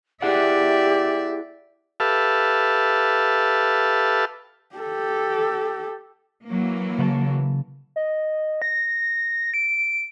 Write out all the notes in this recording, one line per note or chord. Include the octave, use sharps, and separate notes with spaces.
E4 G4 G#4 D5 E5 F#5
G4 A4 B4 E5 F5 A5
G4 A4
E3 F#3 A#3
C#3 B4 A5
D#5
A#6
D7